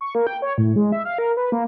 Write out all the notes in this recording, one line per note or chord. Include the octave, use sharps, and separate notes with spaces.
C#6
A#3
G5
C#5
A2
G#3
E5
F5
A#4
B4
A#3